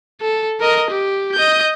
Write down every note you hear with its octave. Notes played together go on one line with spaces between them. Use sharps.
A4
A#4 D#5
G4
D#5 G6